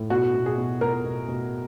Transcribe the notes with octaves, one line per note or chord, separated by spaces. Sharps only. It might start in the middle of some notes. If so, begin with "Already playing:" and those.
Already playing: A2
B2 F#4
B2
G#4
B2
B2 A#4
B2
B2